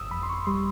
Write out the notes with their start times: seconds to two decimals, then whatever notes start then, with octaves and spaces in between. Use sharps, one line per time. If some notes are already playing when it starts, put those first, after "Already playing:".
Already playing: G1 D#6 E6
0.11 F2 B5
0.23 C6
0.29 C#6
0.46 G3 C6